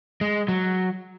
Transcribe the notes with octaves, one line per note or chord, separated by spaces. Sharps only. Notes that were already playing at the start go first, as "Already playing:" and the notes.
G#3
F#3